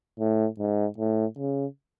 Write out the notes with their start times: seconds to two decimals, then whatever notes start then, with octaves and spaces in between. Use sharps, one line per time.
0.19 A2
0.58 G#2
0.98 A2
1.38 C#3